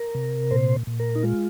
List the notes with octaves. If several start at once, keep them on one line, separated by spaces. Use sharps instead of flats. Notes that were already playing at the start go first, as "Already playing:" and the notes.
Already playing: A#4
C3
A#2 C5
A#2
A#4
D#4
G#3 F4